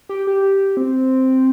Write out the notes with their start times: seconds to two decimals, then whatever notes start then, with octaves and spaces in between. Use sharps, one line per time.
0.09 G4
0.27 G4
0.77 C4